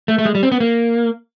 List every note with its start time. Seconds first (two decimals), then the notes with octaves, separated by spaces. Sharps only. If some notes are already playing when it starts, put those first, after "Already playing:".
0.08 A3
0.18 A3
0.25 G#3
0.35 G3
0.43 C4
0.52 B3
0.60 A#3